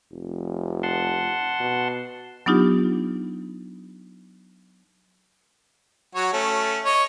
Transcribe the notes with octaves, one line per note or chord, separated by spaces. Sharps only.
F1
F#5 A5 C6
B2
F#3 B3 D4 D#4 F4 G4
F#3 F#4 C#5
A3 C#4
C#5 D#5